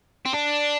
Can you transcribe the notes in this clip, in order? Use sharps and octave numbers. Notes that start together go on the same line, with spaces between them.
C4
D4